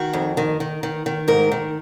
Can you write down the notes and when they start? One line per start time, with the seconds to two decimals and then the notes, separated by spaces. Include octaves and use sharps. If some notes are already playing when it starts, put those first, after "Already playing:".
Already playing: D#3 F#4
0.13 F2
0.37 D#3
0.60 D#3
0.83 D#3
1.06 D#3
1.28 G#2 A#4
1.52 D#3